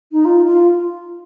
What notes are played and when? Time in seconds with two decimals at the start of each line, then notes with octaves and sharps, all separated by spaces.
0.12 D#4
0.25 F4
0.46 F4